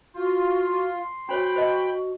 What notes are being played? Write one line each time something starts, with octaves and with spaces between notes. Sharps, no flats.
F4 F#4 C6
D4 F#4 C5 C#5 G5 B5
C5 D#5 A5